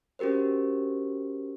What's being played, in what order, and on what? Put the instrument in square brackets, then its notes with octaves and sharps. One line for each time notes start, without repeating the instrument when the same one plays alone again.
[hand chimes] C#4 F#4 G4 A#4 C5